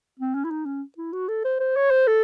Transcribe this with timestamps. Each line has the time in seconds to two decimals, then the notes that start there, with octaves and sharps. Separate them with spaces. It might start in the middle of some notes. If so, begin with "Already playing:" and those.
0.20 C4
0.35 C#4
0.45 E4
0.51 D#4
0.66 C#4
0.98 E4
1.13 F#4
1.28 A4
1.45 C5
1.60 C5
1.76 C#5
1.91 C5
2.07 A4